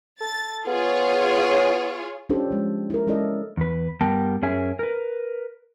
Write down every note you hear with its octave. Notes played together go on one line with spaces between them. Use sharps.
A4 A6
B3 F4 G#4 C#5
C#4 D4 F4 G4 A4 C5
F3 G#3
E4 A#4
G#3 C#4 E4 A4 D5 D#5
E2 B4
G2 G3 B3 A#4 G5 A5
F#2 C#4 G#4 A#4 E5 G#5
A#4 B4